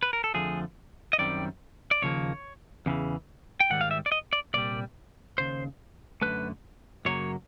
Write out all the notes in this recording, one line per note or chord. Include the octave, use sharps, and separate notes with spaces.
B4
A#4
A4
F2 D3 F3 A3 G#4
D#5
F#2 D#3 G3 C4 D5
D5
D#2 C#3 F3 A#3 C#5
E2 C#3 E3
G5
G#2 D#3 G3 F#5
F5
E5
D5
D#5
D5
C2 A#2 G3 D5
D#2 C#3 C5
F#2 D3 F#3 A3 B4
F#2 C#3 F#3 A#3 C#5